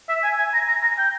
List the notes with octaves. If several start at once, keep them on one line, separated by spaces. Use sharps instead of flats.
E5
G#5
G#5
A#5
A#5
A#5
G5